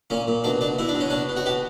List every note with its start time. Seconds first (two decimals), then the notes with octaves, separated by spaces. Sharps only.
0.10 A#2 C#4
0.28 A#2
0.44 B2 D4
0.61 B2 D4
0.79 B2 E4
0.89 D4
0.95 B2
1.00 C#4
1.10 B2 D4
1.29 B2
1.37 F#4
1.46 B2 G4